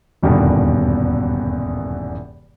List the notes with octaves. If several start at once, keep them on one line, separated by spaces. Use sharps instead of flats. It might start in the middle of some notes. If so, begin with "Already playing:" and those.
D#1 E2 G2 B2 D3 D#3